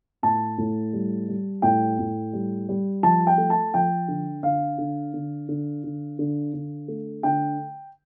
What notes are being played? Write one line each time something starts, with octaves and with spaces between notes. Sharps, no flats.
A2 A5
A2
G3
G3
A2 G5
A2
G3
G3
F3 A5
G5
A3
A5
F3 G5
D3
D3 F5
D3
D3
D3
D3
D3
D3
A3
D3 G5